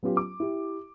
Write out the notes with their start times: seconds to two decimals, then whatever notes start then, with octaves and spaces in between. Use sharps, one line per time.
0.03 F#3 B3 C#4 F4 G4
0.17 D6
0.40 E4 G4